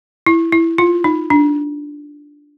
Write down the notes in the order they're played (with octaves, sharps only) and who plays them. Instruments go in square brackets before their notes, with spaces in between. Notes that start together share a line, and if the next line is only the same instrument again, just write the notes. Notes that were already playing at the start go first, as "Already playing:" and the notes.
[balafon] E4
E4
F4
D#4
D4